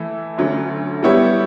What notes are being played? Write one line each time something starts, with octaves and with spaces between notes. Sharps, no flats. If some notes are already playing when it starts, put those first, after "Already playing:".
Already playing: E3 A3 E4
D2 D3 F#3 A3 C#4
G3 B3 E4 G4 C#5